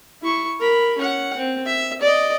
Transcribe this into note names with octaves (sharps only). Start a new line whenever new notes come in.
E4 C#6
A#4 B5
C#4 F#5
C4
E5
D5 D#5